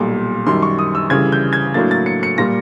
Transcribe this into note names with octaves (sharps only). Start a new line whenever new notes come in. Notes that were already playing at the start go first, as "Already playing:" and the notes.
Already playing: B1 A#2 G3
F#2 D#3 G3 C6
C#6
D#6
E6
D2 C#3 E3 G3 G#6
G6
G#6
A2 F#3 A#3 D4 A6
A6
C#7
C#7
A#2 G3 A#3 A#6